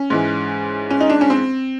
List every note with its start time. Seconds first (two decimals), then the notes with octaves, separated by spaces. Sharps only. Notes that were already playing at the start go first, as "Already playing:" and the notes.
Already playing: C#4
0.10 G#2 E3 G#3
0.90 C#4
1.01 D#4
1.10 D4
1.21 C#4
1.30 C4